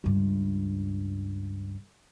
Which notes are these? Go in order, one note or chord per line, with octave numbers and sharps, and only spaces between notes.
C#2 G2